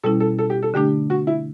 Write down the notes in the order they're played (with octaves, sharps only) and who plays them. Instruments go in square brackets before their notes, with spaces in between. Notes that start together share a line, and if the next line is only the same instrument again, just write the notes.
[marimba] B2 G3 C#4 E4 [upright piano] A4
[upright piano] A4
A4
G4
A4
[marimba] D3 A3 D4 [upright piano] G4
[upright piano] F#4
E4